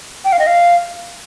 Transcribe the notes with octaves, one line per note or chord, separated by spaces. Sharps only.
G5
F5
D#5
F5